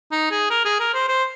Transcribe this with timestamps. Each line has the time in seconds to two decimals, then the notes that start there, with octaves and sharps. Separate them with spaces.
0.12 D#4
0.31 G#4
0.50 A#4
0.65 G#4
0.80 A#4
0.94 C5
1.09 C5